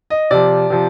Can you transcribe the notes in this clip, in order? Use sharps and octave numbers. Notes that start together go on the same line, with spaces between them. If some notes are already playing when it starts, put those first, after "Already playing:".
D#5
C3 F3 D5
C3 F3